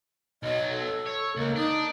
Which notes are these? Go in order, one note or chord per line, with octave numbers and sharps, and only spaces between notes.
B1 F#3 D#5
A4
C#5
C#2 A#3
D4 D#4